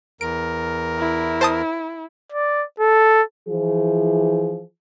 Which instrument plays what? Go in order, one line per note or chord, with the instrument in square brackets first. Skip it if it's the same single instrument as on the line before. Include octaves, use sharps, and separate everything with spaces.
[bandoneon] E2 A#4 [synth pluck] D7
[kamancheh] E4
[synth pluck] C5 A5 D#6
[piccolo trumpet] D5
A4
[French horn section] E3 F3 G#4